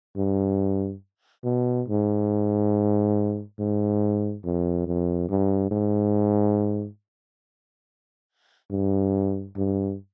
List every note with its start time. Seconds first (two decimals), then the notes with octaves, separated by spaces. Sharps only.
0.17 G2
1.44 B2
1.88 G#2
3.59 G#2
4.44 F2
4.87 F2
5.29 G2
5.71 G#2
8.71 G2
9.56 G2